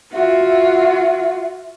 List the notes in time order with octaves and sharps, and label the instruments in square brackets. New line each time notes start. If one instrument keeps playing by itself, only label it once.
[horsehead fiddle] F4 F#4 [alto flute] E5